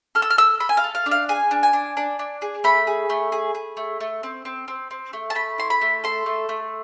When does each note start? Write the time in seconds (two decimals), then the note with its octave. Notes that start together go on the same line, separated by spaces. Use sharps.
0.15 A4 F6
0.22 E6
0.30 F6
0.37 A4 E6
0.60 A4 B5
0.69 G#5
0.77 F5
0.84 A4
0.95 F5
1.06 D4
1.11 F5
1.29 G#4 G#5
1.51 D4
1.63 G#5
1.73 D4
1.97 D4
2.19 D4
2.42 G#4
2.64 A3 B5
2.87 G#4
3.10 A3
3.32 G#4
3.55 G#4
3.77 A3
4.00 A3
4.23 C4
4.45 C4
4.68 C4
4.91 C4
5.13 A3
5.30 A5
5.35 A3 B5
5.58 E4 C6
5.70 B5
5.81 A3
6.04 A4 C6
6.26 A3
6.49 A3